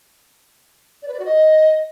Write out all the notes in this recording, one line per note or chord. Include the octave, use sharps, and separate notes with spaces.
D5
B4
D5
F#4
D#5